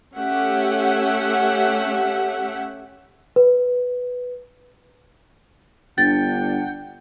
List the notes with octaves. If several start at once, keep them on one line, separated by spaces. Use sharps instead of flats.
A3 C#4 G4 E5 F#5
B4
G1 D4 F#5 G5 A6